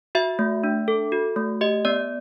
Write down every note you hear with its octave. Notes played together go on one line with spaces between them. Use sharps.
F#4 E5
A3
D4
A4
F#4
A3
G4 D#5
B3 D5